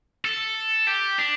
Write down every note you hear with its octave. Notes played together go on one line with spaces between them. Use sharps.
A4
G4
D4